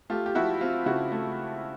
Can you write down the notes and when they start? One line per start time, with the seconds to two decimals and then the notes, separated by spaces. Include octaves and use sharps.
0.10 A3 F4 G4
0.26 G4
0.35 F3 E4 F#4
0.61 C4 F4
0.86 C#3 E4 F#4
1.12 A3